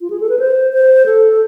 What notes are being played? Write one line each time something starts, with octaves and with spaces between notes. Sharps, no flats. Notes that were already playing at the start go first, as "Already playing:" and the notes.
F4
G#4
A4
B4
C5
C5
A4